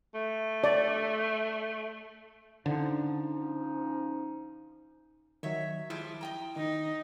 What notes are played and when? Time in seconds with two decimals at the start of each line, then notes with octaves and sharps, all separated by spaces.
0.15 A3
0.64 D5
2.66 D3 F3 C#4 D#4
5.43 D#3 F#3 C#5 E5
5.90 F3 G3 G#3 E4
6.21 D#5 G5 A#5
6.56 D#3 D#4